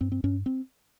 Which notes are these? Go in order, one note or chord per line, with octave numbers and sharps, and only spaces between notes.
G2 C4
C4
G2 C#4
C4